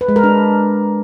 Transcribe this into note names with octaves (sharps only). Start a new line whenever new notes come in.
B4
G#3
A#4
D4